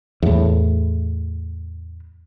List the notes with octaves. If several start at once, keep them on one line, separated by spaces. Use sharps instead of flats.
E2 A2